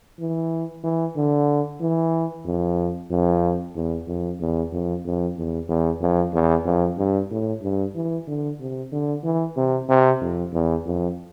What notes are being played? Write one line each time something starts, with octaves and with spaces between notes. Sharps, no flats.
E3
E3
D3
E3
F2
F2
E2
F2
E2
F2
F2
E2
E2
F2
E2
F2
G2
A2
G2
E3
D3
C3
D3
E3
C3
C3
F2
E2
F2